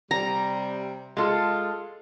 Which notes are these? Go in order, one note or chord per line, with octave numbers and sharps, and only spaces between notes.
C3 G3 A#5
G#3 F4 G#4 A4 C6